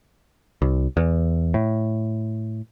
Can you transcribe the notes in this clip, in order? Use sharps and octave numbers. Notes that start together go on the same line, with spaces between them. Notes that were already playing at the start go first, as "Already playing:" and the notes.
C2
E2
A2